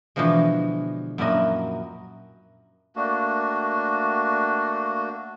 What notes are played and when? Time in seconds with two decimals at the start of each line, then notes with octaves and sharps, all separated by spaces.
0.16 B2 D3 E3 F3 G#3
1.18 F#2 A#2 F3 E4 F#4 D#5
2.96 A3 A#3 D4 F#4